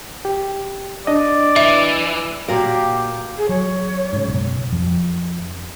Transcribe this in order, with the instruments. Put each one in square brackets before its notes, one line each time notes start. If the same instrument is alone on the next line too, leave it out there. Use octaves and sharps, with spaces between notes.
[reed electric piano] G4
[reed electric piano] D4 D#5 [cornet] D5
[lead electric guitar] E3 [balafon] E5
[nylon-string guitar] A#2 A#4 [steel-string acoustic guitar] F#4 F5 [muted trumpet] G4
[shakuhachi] G#4
[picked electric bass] F#3 [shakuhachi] C#5
[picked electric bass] G#2 C#3
F#1 B1
[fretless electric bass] F2